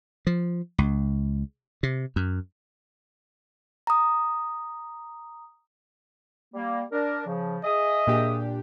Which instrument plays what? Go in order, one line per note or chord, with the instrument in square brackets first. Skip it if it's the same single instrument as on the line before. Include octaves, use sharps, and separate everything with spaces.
[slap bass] F3
C#2
C3
F#2
[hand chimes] A#5 D#6
[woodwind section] G3 A#3
D4 A#4
C#3 F3
[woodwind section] G#4 E5 D#6 [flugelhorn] D#5
[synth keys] A#2 D4 G4